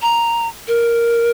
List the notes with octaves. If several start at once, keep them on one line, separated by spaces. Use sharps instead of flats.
A#5
A#4